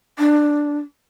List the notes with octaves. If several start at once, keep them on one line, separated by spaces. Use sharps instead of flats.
D4